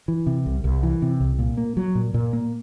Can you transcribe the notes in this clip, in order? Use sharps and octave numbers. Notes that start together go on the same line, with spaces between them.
E3
C3
C2
C2
E3
C3
C2
A#2
A#3
F#3
A#2
A#2
A#3